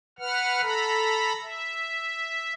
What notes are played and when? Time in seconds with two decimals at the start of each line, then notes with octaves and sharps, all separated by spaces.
0.19 B4 F#5 F6
0.62 A4 A#5 B5
1.42 E5